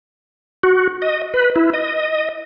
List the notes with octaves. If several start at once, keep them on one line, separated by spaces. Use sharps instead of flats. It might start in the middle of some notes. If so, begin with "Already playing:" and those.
F#4
D#5
B4
E4
D#5